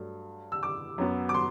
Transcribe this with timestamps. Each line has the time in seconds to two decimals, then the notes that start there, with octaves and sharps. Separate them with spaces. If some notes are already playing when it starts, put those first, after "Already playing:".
Already playing: G2 F#3 A3
0.52 E6
0.63 D6
0.98 F#2 F#3 B3
1.29 D6
1.34 C6